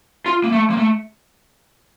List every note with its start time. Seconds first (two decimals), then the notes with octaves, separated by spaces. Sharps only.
0.26 F4
0.44 A#3
0.52 A3
0.70 A#3
0.77 A3